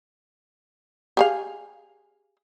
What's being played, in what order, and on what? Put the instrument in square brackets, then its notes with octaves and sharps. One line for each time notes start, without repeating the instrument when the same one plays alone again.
[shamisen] G4 G#4 F5